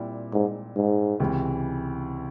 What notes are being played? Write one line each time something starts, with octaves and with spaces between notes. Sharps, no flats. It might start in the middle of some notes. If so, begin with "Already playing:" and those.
Already playing: A#2 G3 C4 E4 G4
G#2
G#2
C#2 C3 E3